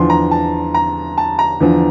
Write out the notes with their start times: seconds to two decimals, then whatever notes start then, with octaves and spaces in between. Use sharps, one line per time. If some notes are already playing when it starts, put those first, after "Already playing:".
Already playing: E2 D3 F3 C6
0.10 A#5
0.31 A5
0.74 A#5
1.18 A5
1.39 A#5
1.60 E2 D3 F3